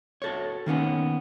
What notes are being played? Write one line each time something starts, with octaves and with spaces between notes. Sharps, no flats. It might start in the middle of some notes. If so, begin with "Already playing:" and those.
F#4 A4 C#5
D#3 A#3 B3 C#4